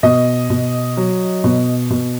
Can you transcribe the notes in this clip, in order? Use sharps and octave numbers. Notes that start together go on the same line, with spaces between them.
B2 D#5
B2
F#3
B2
B2